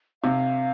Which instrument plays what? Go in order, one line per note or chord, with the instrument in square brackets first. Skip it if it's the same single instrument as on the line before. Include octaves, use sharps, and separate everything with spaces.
[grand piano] C3 [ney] F5